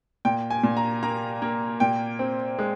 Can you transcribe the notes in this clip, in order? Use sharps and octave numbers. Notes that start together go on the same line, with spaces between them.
A#2 G5
G#5
A#2
A#5
A#3 A#5
A#3
A#2 G5
C4
G#3